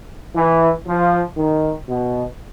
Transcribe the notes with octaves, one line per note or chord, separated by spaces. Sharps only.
E3
F3
D#3
B2